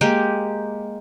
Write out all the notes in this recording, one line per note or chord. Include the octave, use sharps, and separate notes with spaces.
G#3 A#3 G4